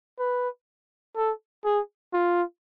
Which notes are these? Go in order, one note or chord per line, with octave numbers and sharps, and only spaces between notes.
B4
A4
G#4
F4